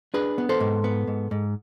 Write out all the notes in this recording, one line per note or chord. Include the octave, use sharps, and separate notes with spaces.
D4 G#4 B4
B3
A4 C5
G#2
B3
G#2
G#2